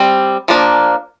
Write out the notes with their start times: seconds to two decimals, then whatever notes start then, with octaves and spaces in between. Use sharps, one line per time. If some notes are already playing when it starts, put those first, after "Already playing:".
Already playing: G3 C4
0.48 F3 A#3 D4